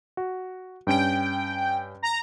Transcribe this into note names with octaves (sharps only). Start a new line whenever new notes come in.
F#4
G2 C#4 G5 D7
A#5